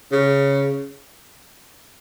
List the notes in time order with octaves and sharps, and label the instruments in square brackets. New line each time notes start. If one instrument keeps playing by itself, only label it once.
[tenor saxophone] C#3